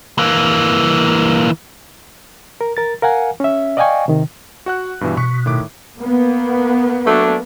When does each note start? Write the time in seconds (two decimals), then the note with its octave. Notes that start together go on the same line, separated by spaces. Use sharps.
0.18 E3 A#3
2.61 A#4
2.77 A#4 A6
3.02 A#4 F5 F#5 G#5
3.40 C#4 E5
3.77 D5 D#5 F5 G5 G#5 C#6
4.08 C3 D#3
4.66 F#4 F#5 F#6
5.01 G2 B2 E3
5.17 B2 C#6
5.46 A2 D#3 D6
5.98 A#3 B3
7.06 F#3 A3 D4